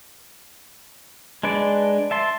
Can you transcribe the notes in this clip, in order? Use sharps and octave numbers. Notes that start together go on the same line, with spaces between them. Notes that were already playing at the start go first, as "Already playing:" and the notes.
G#3 D4 B4 D5
E5 A5 C6